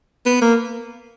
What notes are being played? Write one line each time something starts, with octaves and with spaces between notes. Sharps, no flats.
B3
A#3